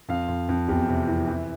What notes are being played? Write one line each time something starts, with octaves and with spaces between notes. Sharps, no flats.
F2 F5
F2
F2
E2 G4
C3
E3
E3